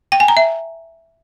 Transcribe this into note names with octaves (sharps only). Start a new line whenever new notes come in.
G5
G#5
A#5
E5